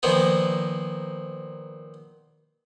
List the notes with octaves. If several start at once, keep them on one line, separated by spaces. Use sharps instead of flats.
A#2 D#3 F3 B3